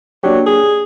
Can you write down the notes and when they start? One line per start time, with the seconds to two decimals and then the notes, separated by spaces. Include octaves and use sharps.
0.24 F#3 A#3 D4 G4
0.47 G#4